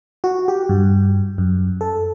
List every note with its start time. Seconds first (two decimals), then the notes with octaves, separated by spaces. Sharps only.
0.24 F#4
0.48 G4
0.69 G2
1.38 F#2
1.81 A4